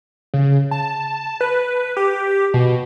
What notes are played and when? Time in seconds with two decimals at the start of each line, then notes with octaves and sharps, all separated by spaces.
0.34 C#3
0.71 A5
1.41 B4
1.97 G4
2.54 B2